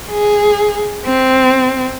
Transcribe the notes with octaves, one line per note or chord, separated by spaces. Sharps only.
G#4
C4